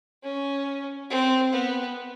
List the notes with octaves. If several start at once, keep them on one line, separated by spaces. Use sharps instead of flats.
C#4
C4
B3